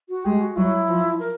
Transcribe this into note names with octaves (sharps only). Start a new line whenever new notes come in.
F#4
G#3 G4
F#4
F#3 E4
F3
A#4